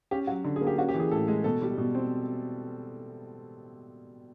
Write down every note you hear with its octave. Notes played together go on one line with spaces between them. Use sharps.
C#4 G4
F#3 F#4
D3
G#4
A#3
G4
C#4 F#4
G4
E3
G#4
A2 A4
G#3
B2 A4
G3
B2
C4